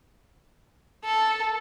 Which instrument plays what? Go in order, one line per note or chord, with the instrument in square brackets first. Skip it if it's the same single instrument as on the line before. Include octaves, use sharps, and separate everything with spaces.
[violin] A4